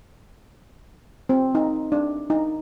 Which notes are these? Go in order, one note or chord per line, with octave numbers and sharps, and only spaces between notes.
C4
D#4
D4
D#4